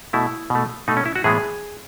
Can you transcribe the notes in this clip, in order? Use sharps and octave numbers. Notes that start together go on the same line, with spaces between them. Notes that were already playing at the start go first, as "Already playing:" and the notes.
B2 A3 E4
B2 A3
B2 A3 D#4
C#4
E4
F#4
A2 E3 G#3 B3 G#4